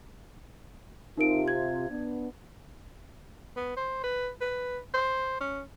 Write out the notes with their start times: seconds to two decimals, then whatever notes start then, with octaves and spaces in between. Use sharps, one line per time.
1.17 C3 D#4 F4 A#4 D7
1.48 G#6
1.89 B3 D4
3.56 B3
3.77 C5
4.04 B4
4.41 B4
4.94 C5
5.41 C#4